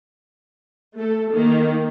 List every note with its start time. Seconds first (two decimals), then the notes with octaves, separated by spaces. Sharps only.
0.95 A3 A4
1.32 D#3 A#3